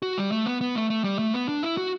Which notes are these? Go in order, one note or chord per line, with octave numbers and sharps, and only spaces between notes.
F#4
G3
A3
B3
B3
A3
A3
G3
A3
B3
D4
E4
F#4